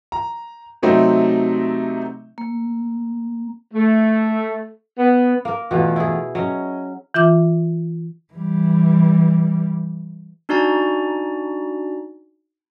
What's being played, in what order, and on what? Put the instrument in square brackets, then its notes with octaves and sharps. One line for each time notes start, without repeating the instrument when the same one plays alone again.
[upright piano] A#5
C3 F#3 A3 C4 D#4
[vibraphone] A#3
[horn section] A3
B3
[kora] A#3 A#4
[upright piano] E2 A3 F4 [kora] B2 F#4
[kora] E4 G#4
[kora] F#3 C#4 [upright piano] D#5
[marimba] E3 F4 E5 D6
[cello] E3 G3
[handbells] D4 D#4 F#4 D5 G#5 A#5